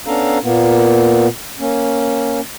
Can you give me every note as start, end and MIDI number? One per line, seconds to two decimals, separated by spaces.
0.07 0.38 59
0.07 0.38 61
0.07 0.38 62
0.07 0.38 69
0.07 0.38 77
0.07 0.38 82
0.43 1.28 46
0.43 1.28 58
0.43 1.28 59
1.60 2.41 58
1.60 2.41 61